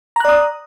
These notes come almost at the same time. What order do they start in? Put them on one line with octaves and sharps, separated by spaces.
A#5 F#6 D5 D#6